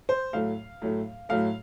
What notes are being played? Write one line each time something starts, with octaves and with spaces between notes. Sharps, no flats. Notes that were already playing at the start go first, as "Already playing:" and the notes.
C5
A2 F#3 A3 F5
A2 F#3 A3
A2 F#3 A3 F5